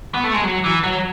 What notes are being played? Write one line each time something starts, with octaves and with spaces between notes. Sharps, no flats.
B3
A3
G#3
F#3
E3
F#3